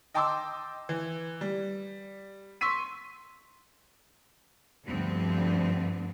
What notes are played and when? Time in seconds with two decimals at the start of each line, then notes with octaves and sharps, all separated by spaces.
0.14 D#5 G5 A5 C6 D6 E6
0.89 E3
1.41 G3
2.61 C6 C#6 E6 B6 D#7
4.87 D2 G2 D3 F3 B3 C4